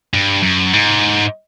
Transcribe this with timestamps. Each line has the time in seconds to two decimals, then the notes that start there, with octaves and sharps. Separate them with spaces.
0.14 G2
0.43 F#2
0.73 G#2